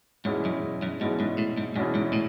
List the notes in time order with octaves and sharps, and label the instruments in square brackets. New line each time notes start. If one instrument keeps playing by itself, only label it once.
[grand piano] E2 B2 G#3 C#4 E4 [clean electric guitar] G#2
[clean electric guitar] F#2
F#2
[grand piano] E2 B2 G#3 C#4 E4 [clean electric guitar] G#2
[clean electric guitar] G#2
A2
G#2
[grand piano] E2 B2 G#3 C#4 E4 [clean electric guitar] G#2
[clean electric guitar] G#2
A2